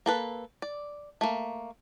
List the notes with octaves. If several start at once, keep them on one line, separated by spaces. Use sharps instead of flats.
A#3 A4 B4
D5
A3 A#3